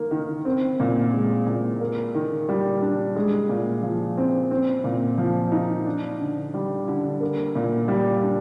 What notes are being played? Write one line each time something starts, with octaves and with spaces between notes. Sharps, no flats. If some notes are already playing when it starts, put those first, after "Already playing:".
Already playing: D#3 A#3
D#3
C4
A#2
G#3
A#2
A#3
D#3
G3
D4
G#3
A#2
F3
C4
C4
A#2
F3
D#4
D4
D3
G3
D3
A#3
A#2
G3
D4